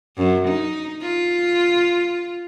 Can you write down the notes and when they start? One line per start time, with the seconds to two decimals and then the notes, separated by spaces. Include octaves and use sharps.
0.17 F#2
0.48 D#4
1.01 F4